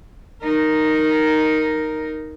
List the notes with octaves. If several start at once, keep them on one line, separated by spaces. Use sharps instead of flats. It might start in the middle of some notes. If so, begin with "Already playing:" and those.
D#4 A#4